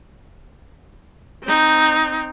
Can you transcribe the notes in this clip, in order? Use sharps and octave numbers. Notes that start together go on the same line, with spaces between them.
C4 D#4